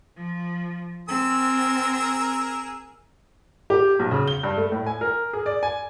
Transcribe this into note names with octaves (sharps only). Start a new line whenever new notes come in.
F3
C4 G#4 A#4 E6
G4
B1
C#3
G7
G2
A3
A2
G#5
A#4
G#4
D5
G#5